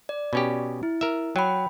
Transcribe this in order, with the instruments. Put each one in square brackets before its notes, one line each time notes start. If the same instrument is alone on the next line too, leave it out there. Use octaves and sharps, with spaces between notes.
[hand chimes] D5
[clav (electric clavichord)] B2 C#4 G4
[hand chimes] E4
[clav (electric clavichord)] A#4 E5
[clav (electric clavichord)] F#3 [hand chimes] G5 B5